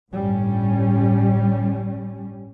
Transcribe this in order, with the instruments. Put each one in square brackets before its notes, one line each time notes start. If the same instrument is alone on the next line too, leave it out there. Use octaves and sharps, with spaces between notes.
[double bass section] G1 A2 G3 C#4